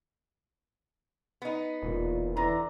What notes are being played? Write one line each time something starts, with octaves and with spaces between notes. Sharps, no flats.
B3 D#4
E1 A#2
D3 E3 A#5